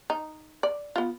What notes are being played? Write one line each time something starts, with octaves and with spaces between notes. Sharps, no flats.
D#4
D5
B3 F4